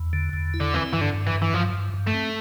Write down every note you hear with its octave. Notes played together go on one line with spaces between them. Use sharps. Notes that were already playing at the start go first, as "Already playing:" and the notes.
Already playing: E2
D3
E2
E4
D3
E3 C4
G2 E3
D3
G2
E3
G2
E3
G2 F3
G2
G2
A3
C4